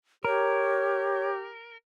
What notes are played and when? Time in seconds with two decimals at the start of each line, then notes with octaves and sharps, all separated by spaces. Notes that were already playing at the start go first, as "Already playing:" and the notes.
0.25 G4 A#4 C#5